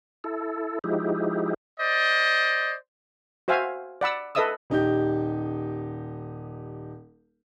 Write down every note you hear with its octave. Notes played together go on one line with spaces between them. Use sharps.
E4 A4
F3 G#3 D#4 E4 G4
C5 D5 D#5
F#4 C5 E5 F5 G#5
D5 F#5 B5 E6
A4 B4 D#5 E5 D#6 E6
D#1 D#4 G4 G6